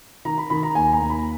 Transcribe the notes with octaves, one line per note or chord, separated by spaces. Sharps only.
D#3 A#5
B5
D#3 B5
A#5
D#2 G#5
A#5
D#2
B5